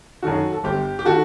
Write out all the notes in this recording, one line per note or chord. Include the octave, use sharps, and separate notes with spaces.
F#2 D#3 F#4 A4
A4
G1 G4
G4
D#3 F#4 A4